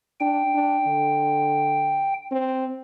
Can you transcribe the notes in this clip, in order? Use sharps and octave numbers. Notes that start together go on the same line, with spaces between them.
D4 G5
D4
D3
C4